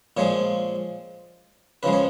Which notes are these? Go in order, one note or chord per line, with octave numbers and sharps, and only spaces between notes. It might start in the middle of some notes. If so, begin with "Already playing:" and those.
A#2 F3 G#3 C#5
C#3 F3 G#3 B4
C#5